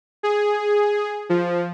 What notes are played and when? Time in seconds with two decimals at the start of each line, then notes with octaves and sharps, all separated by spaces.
0.23 G#4
1.29 F3